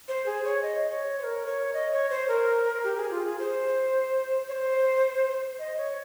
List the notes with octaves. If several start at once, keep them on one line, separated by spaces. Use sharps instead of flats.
C5
G#4
C#5
D#5
C#5
C5
A#4
C#5
D#5
C#5
C5
A#4
G4
G#4
F4
G#4
C5
C#5
C5
D#5
C#5